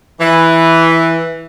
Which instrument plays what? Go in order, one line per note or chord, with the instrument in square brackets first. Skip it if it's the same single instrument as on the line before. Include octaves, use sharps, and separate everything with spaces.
[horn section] E3